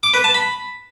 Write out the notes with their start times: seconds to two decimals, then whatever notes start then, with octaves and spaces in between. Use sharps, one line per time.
0.03 D6
0.14 B4
0.24 A5
0.34 B5